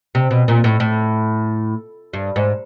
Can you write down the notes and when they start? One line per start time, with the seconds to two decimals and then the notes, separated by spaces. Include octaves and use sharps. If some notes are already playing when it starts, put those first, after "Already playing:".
0.15 C3
0.31 B2
0.48 A#2
0.64 A2
0.80 A2
2.13 G2
2.36 G#2